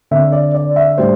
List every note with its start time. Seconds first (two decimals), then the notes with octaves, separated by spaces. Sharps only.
0.11 D3 C4 E5
0.32 D5
0.54 D5
0.76 E5
0.98 A2 G3 D4 C5